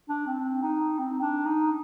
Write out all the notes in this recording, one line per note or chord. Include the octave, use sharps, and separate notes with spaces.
D4
C4
D#4
C4
D4
D#4